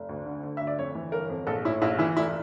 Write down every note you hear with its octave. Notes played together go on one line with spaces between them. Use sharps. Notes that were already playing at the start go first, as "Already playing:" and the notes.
Already playing: F1
D2
D3
D3
D2 E5
D5
F2 C#5
E3
G1 A#4
F2
A#1 A4
A2 E4
A#1 E4
E3 E4
F1 E4